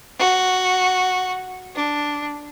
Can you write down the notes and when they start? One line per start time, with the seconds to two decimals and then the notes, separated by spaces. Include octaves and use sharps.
0.20 F#4
1.77 D4